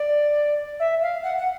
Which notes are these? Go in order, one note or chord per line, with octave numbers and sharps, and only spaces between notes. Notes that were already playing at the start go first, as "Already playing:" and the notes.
Already playing: D5
E5
F5
F#5
F#5